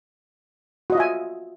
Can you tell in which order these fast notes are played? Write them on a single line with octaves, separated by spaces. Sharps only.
F#4 D#5 F4 E5 G#5